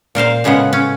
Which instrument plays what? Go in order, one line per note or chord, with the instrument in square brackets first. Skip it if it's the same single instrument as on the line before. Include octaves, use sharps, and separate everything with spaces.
[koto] A#2 A#4 C5 F5
A2 C#3 G#3 B3 F#5
C#4